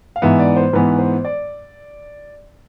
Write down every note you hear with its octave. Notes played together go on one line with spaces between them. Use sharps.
F5
G#2 E3 B3 E5
D5
C5
G#2 E3 B3 B4
C5
D5